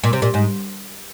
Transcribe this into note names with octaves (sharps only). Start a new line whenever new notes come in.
A#2
C3
A#2
G#2